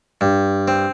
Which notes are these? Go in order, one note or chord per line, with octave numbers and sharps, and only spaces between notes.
G2
C4